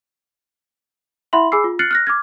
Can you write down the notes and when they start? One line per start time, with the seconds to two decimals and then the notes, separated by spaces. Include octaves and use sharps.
1.33 E4 E5 F#5 B5 C6 F#7
1.52 G#4 G#5 B5 D6 E6 C7
1.64 F4
1.79 F6 F#6 A6 C7 C#7 F#7
1.91 F6 F#6 A#6
2.07 D6 F6 G#6